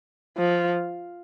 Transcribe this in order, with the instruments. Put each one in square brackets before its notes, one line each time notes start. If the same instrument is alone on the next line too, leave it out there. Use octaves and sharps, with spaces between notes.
[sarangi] F3